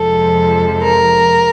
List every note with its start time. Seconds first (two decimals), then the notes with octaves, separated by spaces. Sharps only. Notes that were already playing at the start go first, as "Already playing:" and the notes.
Already playing: F2 C3 F3 G#3 A4
0.81 A#4